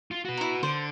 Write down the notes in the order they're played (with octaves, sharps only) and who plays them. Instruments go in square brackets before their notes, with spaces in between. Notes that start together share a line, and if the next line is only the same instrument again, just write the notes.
[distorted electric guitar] F4
F#4 B4
[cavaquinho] E4 A#5
[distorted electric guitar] D3 [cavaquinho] C5